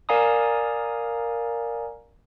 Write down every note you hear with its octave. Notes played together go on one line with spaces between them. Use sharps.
A#4 D5 F5 G#5 A#5 D#6